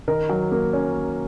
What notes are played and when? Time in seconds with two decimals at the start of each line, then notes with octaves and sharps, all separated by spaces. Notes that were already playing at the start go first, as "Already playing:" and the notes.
0.08 D#3 A#4
0.29 F#3
0.52 A#3
0.73 C#4